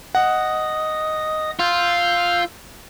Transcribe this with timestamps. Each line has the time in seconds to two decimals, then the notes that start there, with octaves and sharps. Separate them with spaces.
0.15 D#5 F#5 D#6
1.59 F4 E6 G6